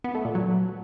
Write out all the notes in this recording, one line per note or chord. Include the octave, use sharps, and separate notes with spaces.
B3
A3
A#2
F#3